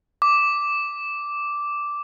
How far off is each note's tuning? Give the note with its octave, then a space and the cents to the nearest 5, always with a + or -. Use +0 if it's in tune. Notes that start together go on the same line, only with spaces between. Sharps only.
D6 -5